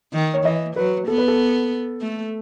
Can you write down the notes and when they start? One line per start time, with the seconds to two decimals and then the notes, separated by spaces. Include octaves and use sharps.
0.13 D#3
0.34 C#5
0.44 E3 D#5
0.76 F#3 B4
1.08 B3 A4
1.18 B4
1.28 A4
2.01 A3